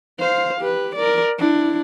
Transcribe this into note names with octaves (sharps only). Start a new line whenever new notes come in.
C5 F5
G4 B4
A#4 D5
D4 E4